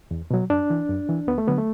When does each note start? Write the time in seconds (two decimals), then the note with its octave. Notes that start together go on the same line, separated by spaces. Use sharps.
0.11 E2
0.31 B2 F#3
0.50 F#2 D4
0.70 E3
0.88 F#2
1.09 E3
1.27 D2 B3
1.38 A3
1.47 D3 F#3 B3
1.58 A3